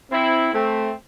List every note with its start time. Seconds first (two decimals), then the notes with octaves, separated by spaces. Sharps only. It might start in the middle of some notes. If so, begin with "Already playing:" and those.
0.11 C4 E4
0.53 A3 C4